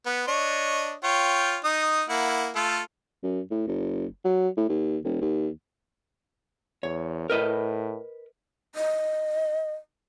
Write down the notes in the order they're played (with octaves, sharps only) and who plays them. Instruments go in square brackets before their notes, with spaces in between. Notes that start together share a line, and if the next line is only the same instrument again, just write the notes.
[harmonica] B3
D4 C#5 D#5
F4 C#5 G5
D#4 D#6
A#3 E4 F#5
A3 F4 A4
[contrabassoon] F#2
A2
F#1
F#3
A2
D#2
E1
D#2
[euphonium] E2 [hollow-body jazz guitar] C#5
[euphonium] A2 [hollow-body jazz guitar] A#4 B4 D#5
[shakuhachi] D#5